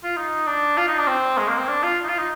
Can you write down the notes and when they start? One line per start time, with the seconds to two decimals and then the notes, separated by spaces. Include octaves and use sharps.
0.03 F4
0.16 D#4
0.47 D4
0.77 F4
0.87 D#4
0.98 D4
1.07 C4
1.38 G#3
1.48 A#3
1.58 C4
1.68 D4
1.83 F4
2.04 D#4
2.08 F4
2.18 D#4